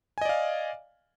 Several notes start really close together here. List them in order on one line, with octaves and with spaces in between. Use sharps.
G#5 D#5 D5 F5